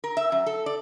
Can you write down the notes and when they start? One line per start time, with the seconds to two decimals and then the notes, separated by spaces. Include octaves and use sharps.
0.04 A#4
0.17 E5
0.32 F#2
0.46 A4
0.66 D5